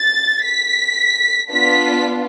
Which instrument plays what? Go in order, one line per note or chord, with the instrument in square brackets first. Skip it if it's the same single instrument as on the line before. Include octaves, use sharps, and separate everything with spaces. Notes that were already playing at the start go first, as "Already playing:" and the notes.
Already playing: [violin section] A6
B6
B3 D4 F4 B6